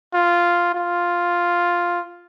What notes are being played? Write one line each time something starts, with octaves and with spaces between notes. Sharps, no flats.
F4
F4